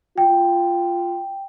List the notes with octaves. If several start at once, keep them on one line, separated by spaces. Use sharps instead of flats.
F4 G5